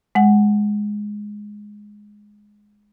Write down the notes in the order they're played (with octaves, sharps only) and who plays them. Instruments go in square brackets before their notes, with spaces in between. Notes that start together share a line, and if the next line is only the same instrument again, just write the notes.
[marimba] G#3 F#5